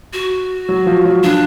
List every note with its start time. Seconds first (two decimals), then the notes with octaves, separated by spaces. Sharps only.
0.13 F#4
0.69 F#3
0.87 F3
1.05 F#3
1.23 F3 D4